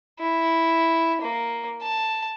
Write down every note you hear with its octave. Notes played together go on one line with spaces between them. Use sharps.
E4
A#3
A5